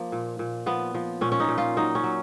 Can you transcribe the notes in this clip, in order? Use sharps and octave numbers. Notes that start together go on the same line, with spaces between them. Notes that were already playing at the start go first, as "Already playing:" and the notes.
Already playing: F3 A#3
A#2
A#2
F3 B3
F3
A#2 C#4
C#4
D#4
A#2
F4
F#3 D#4
C#4
F#3